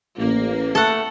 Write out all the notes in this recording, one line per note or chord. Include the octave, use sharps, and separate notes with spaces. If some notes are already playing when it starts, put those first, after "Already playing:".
A1 A#3
A3 A4 F#5